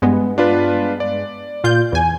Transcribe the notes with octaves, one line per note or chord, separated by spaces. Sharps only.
G2 G#3 B3
D4 F4 B4
D5
A#2 F4 G6
E2 G#5